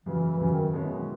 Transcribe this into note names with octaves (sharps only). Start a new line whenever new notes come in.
F#2 C#3 E3 F#3
F#2 C#3 E3 F#3
D#3
B2 G#3 C#4 E4